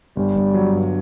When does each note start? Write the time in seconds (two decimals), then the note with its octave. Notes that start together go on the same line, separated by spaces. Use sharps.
0.16 G1 G3
0.36 G1
0.54 F#3
0.72 G2